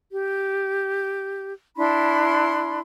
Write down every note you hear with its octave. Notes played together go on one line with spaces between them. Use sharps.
G4
D4 E4 B5 C6